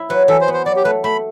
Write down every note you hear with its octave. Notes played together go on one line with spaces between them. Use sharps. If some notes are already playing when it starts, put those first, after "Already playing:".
Already playing: E4
F#3 B4
E3 A4
C5
B3
C5
F#3 D5
G4
A3 B4
A3 B5